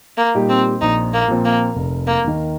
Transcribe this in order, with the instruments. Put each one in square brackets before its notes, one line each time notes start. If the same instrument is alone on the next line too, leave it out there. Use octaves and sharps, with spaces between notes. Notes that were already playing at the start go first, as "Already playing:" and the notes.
[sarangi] A#3
[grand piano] A#2 G3 D#4 G4
[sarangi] C4
[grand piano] A#1 [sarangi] D#4
[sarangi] A#3
[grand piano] A#2 F3 C4
[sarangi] A#3
[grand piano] F1
[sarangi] A#3
[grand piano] D#2 D#3